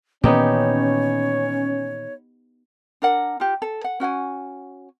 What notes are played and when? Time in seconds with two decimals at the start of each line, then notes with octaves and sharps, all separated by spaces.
0.24 A#2 D#3 E3 B3 C#4 D#4 G4 C#5
3.02 D4 A#4 F#5
3.40 F4 G4
3.62 A4
3.84 F#5
4.00 C#4 F#4 F#5 G#5